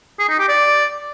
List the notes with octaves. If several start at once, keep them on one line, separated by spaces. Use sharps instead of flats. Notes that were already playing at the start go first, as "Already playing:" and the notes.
G#4
D#4
G4
D5